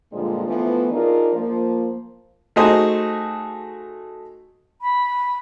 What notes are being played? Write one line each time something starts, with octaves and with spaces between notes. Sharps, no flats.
G2 A#2 D3 F3 G#3
E3 F3 A3 B3
D4 D#4 F4 G#4 A#4
F3 A#3
A3 D#4 F#4 G#4 C5
B5